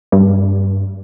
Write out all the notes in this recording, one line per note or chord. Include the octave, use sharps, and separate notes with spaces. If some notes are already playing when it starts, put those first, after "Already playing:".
G2